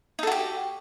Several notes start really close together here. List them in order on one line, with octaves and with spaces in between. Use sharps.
D#4 A4 F#4 G4